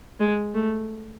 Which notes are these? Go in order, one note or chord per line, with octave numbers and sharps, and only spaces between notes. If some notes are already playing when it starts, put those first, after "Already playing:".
G#3
A3